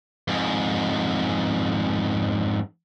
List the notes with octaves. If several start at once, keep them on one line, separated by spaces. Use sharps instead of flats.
F2 G#2